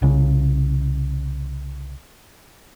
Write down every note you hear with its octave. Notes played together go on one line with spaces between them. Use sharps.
C2 C#3